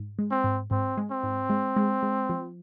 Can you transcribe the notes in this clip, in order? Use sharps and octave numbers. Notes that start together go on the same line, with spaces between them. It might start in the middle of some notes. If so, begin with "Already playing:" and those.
Already playing: G#2
G#3
C4
G#2
G#2 C4
G#3
C4
G#2
G#3
G#3
G#3
F3